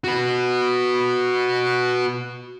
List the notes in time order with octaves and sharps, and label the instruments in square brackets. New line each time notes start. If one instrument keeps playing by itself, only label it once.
[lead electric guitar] F#4 B4